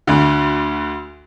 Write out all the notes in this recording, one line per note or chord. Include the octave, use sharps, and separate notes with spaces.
D2 D3